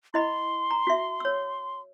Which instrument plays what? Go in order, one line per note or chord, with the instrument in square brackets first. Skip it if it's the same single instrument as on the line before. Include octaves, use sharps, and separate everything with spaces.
[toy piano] E4 D#5 B5 [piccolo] C6
[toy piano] A#5
F#4 E5
C#5 E6